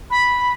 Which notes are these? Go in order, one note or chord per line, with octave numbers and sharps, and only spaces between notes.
B5